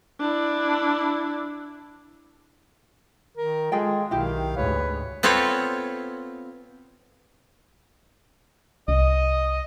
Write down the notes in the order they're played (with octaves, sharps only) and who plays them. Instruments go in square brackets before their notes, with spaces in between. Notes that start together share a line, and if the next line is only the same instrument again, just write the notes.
[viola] D4 E4
[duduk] D#3 [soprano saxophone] A#4
[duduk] G#3 [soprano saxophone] F4 [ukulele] G#4 A4 G5
[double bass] B1 [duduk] D#3 [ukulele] E4 G4 [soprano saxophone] F5
[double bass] D2 G#2 [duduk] B4 [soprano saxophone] C#5
[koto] B3 C4 F4 A4 C#5
[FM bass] C2 [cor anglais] D#5